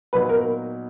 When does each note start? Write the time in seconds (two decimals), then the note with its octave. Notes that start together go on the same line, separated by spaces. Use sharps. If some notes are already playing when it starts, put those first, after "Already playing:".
0.13 A#2 F#3 B3 D#4 B4
0.29 A#4